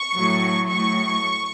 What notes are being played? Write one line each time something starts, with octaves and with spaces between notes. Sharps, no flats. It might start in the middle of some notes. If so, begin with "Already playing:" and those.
Already playing: C#6
A2 F#3
A2 F#3 C#6